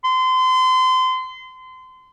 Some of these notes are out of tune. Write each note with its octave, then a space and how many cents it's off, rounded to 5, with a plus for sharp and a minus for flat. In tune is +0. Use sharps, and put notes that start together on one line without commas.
C6 -30